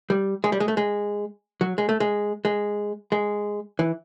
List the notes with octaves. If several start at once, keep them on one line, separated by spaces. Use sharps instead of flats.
G3
G#3
G3
G#3
A3
G#3
F#3
G#3
A3
G#3
G#3
G#3
E3